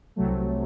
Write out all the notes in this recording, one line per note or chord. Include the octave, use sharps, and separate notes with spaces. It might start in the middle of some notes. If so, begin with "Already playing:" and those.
C2 C3 F#3 A3